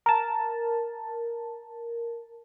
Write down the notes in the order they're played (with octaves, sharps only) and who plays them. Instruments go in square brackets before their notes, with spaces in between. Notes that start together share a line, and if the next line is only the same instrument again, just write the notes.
[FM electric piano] A#4 A5